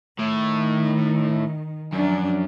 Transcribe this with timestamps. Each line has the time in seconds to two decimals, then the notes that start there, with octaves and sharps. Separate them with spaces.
0.19 A2 D#3
1.93 F#2 F3 D4